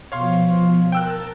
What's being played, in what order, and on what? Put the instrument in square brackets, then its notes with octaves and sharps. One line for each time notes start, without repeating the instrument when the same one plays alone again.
[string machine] B2 F3 [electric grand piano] C#5 F5 C6
[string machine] A#4 A5 [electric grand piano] G5 E6 F#6